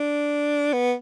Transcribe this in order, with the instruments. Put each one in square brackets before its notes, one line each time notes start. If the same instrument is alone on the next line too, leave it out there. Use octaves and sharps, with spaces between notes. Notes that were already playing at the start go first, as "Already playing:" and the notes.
Already playing: [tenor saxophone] D4
B3